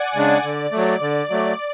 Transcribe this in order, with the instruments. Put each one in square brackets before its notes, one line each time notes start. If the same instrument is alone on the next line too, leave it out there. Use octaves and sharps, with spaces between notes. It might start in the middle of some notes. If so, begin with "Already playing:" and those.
Already playing: [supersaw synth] D5 F#5 G#5
[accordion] C#3 G#3 D4
D3
F#3 A3
[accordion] D3 [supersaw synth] D5
[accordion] F#3 A3 [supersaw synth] D5